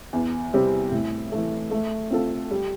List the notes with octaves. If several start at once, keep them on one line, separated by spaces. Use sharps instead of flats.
E2
C3 G3 C4
A2
E3 A3
A3
C4 F4 A4
G3